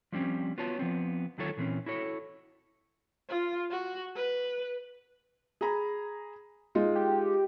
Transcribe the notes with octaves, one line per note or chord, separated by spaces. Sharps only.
F3 G3 A#3 C4 C#4
B3 F4 F#4 C#5 A5
F3 B3 C4
D2 D#3 F#3 F4 A4 C#5
A#2 E3 C4 C#4
E4 F#4 A4 C#5
F4
F#4
B4
G#4 A#5 B5
G#3 D#4 F4
G4